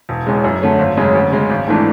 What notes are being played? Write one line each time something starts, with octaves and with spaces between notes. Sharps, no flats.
E1
E2 C#3 G#3
F#2
D3 A3 C#4
G#1
F#2 C#3 G#3 C#4
D2
C#3 G#3 C#4
G#1
G#2 E3 A3 D4